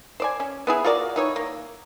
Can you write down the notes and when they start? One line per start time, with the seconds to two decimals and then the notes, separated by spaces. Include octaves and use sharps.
0.20 C5 D5 G#5
0.40 C#4
0.67 B3 E4 G#4
0.84 F4 F#4 A#4 D5
1.16 E3 D#4 C#5
1.36 A#3